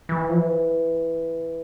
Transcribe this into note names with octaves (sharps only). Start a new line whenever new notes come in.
E3
F3
E3